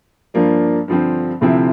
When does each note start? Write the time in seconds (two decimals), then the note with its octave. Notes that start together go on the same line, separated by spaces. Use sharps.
0.34 G2 F3 A#3 D4
0.88 G2 D3 F3 C4
1.41 D2 C3 F3 C4 E4